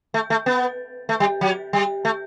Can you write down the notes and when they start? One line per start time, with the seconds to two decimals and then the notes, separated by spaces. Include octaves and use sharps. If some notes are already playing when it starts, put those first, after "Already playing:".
0.14 A3
0.30 A3
0.46 B3
1.09 A3
1.20 G3
1.41 F#3
1.73 G3
2.05 A3